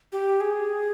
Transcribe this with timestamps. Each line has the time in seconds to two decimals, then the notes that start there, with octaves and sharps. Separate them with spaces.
0.12 G4
0.41 G#4